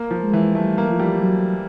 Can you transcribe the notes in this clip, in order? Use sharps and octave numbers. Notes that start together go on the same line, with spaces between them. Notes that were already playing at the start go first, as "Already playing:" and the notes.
Already playing: A#3
F3
G#3
E3
G3 A3
A#3
F3
G3
F#3